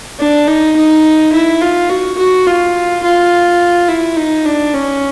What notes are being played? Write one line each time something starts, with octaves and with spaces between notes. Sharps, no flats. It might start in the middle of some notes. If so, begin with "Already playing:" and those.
D4
D#4
D#4
E4
F4
F#4
F#4
F4
F4
E4
D#4
D4
C#4